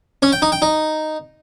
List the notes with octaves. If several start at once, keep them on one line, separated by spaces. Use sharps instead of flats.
C#4
G5
D#4
G5
D#4